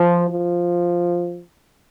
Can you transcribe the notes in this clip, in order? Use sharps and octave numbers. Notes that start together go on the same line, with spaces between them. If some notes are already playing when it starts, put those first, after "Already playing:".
Already playing: F3
F3